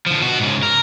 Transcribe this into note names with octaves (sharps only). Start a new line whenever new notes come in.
D3 F3
B2 F#4
G#2 C#3
A#4